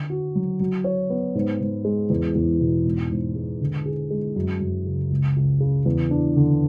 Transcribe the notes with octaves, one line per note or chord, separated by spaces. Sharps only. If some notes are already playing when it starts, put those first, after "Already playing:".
Already playing: D3
F#4
F#3
F#3
C#5
B3
G#2
G#2
G#3
E2
E2
B2
G#2
G#2
G#3
D3
G#4
G#3
F#2
F#2
C#3
C#2
C#2
C#3
E2
D4
D3